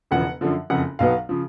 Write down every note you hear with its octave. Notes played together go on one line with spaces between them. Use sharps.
E1 E2 C#3 F3 F#5
F#2 D3 F3
F#1 F2 C#3 F#5
B1 B2 F#3 B3 F5
C#3 F3